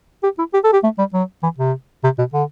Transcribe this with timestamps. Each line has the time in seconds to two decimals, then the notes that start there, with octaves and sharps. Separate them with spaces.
0.24 G4
0.38 E4
0.54 G4
0.64 A4
0.73 G4
0.83 A3
0.98 G3
1.14 F#3
1.43 E3
1.58 C3
2.04 C3
2.18 B2
2.34 D3